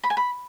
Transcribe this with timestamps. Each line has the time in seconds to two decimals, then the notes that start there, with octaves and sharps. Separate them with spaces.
0.04 B5
0.10 G#5
0.17 B5